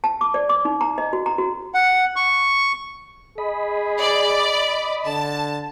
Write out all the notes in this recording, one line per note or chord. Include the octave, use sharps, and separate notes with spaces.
A5
D6
D5
D6
D#4
A#5
D#5
F#4
A#5
F#4
F#5
C#6
G#4 D#5 B5
D5
D3 A5